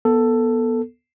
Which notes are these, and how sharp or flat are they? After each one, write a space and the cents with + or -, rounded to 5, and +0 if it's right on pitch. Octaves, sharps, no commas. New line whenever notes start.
B3 -20 A4 +10